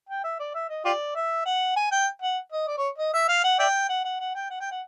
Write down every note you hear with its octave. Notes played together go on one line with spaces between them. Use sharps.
G5
E5
D5
E5
D#5
F4 G4 D5
E5
F#5
G#5
G5
F#5
D#5
D5
C#5
D#5
E5
F5
F#5
D5 E5 G5
F#5
F#5
F#5
G5
F#5
G5
F#5